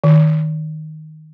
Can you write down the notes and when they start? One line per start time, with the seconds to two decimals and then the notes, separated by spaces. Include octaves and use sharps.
0.04 D#3